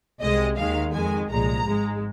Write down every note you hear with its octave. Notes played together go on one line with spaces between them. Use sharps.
C2 C3 G#3 D#5
D#2 D#3 G#3 F5
F2 D#3 G#3 G#5
C2 A#2 F3 G#3 A#5
G#1 G#2 G#3